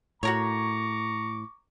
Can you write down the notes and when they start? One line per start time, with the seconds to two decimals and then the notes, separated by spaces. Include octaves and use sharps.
0.23 A2 F#4 A#4 C#5 A#5 C#6 D6